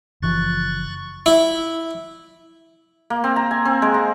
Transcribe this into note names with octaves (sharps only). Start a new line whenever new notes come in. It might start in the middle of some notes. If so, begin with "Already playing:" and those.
F#1 E3 F3 C#6 F#6 A6
E4
A#3
C4
A#5
G#5
C4
G#3
A#5